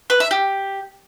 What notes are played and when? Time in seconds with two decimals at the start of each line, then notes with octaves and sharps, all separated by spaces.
0.10 B4
0.20 E5
0.31 G4